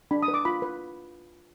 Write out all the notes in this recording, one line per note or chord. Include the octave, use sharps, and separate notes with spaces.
D4 B5
D#6
B4
D6
F4 B5
B4